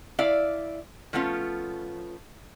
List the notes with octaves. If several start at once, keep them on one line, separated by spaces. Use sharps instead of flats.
E4 D5 F5
F3 A3 B3 C#4 F4